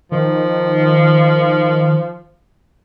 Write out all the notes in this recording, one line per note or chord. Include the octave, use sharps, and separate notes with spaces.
D#3 F3